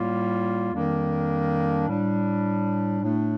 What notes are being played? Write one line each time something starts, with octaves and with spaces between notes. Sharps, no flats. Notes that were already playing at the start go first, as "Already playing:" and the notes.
Already playing: A2 G3 A#3 F4
F2 D#3 G3 A#3 D4
A2 G3 D4
A2 A3 D4